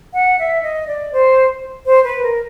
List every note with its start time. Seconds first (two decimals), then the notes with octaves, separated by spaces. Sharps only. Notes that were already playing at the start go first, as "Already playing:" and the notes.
0.14 F#5
0.39 E5
0.63 D#5
0.87 D5
1.13 C5
1.86 C5
2.04 B4
2.23 A#4